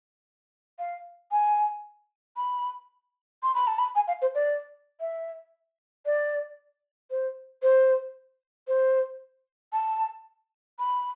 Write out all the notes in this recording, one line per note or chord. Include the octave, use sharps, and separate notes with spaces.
F5
G#5
B5
C6
B5
A5
B5
G#5
F5
C5
D5
E5
D5
C5
C5
C5
A5
B5